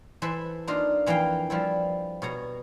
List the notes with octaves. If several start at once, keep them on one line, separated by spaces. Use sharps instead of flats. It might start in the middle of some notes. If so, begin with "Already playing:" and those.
E3 A4 C5 E5 B5
A#3 D4 D#4 F4 D#5
F2 E3 A#3 F5 G5
F3 G3 E4
B2 C#5 A#5